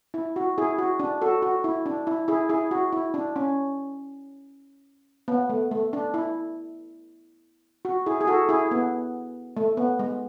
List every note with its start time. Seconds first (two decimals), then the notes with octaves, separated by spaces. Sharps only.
0.14 E4
0.36 F#4
0.58 E4 G#4
0.78 F#4
1.00 D4
1.22 F#4 A4
1.42 F#4
1.64 E4
1.86 D4
2.07 E4
2.28 E4 G#4
2.49 E4 G#4
2.71 F#4
2.93 E4
3.14 D4
3.36 C#4
5.28 B3
5.49 A3
5.71 A3
5.93 D4
6.14 E4
7.85 F#4
8.06 E4 G#4
8.21 G#4
8.27 F#4 A4
8.49 E4 G#4
8.71 B3
9.57 A3
9.77 B3
9.99 G#3